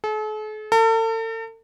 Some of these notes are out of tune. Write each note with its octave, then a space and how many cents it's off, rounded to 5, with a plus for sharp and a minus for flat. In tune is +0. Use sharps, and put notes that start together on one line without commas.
A4 -45
A4 +40